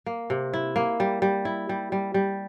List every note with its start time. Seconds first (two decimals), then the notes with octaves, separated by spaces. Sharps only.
0.06 A#3
0.30 C3
0.54 E4
0.76 A#3
1.00 G3
1.22 G3
1.45 E4
1.69 G3
1.92 G3
2.14 G3